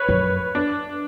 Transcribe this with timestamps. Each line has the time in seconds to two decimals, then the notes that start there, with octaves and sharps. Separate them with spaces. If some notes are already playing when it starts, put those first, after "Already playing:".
Already playing: B4 C#5
0.09 F#2
0.55 D4